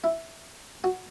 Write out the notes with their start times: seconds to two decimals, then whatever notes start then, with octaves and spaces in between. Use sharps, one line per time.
0.04 E4
0.84 F#4